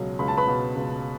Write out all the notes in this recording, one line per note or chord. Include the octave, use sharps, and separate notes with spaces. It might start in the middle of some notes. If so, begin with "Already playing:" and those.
Already playing: C#2 B2 F#3
C#2 B5
A5
B4 B5
B2
C#2